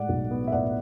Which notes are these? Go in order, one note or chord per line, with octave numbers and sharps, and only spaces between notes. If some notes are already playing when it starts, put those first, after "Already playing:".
Already playing: A2 G#3 D5 F#5
B1
B3
E5
A2 D5 F#5